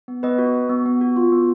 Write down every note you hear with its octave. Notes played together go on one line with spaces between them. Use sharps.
B3
B3 B4 D#5
F#4
F#4
B3
B3
F#4
F4
B3